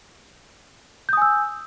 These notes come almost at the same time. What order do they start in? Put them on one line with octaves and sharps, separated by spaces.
G6 D#6 G#5 E6